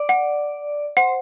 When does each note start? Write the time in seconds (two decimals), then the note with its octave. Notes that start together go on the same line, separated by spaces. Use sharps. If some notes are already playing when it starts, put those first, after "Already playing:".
Already playing: D5
0.09 F#5
0.97 C5 F#5